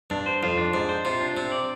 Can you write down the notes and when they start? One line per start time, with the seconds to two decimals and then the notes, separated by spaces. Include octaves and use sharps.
0.10 G2 D4
0.26 C5
0.43 F2 F4
0.58 D4
0.73 G#2 D4
0.89 C5
1.05 C3 F4
1.21 D4
1.37 C3 C4
1.52 D5